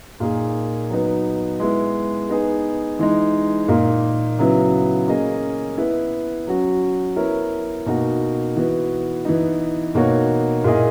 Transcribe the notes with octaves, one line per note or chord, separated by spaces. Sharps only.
A#2 A#3 D#4 G#4
F#3 B3 D#4
G#3 B3 E4
B3 D#4 G#4
E3 G#3 D#4
A#2 A#3 D#4
C#3 F#3 B3 E4
A#3 C#4 G#4 D#5
B3 E4 B4
F#3 C#4 F#4
B3 E4 A#4 C#5
B2 A#3 D#4 F#4
E3 B3 F#4
E3 B3 D#4
B2 A#3 D#4 F#4 C#5
A#2 A#3 E4 G#4 D#5